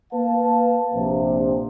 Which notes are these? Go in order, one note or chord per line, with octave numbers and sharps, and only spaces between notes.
A#3 B4 F5 A5
A#1 C3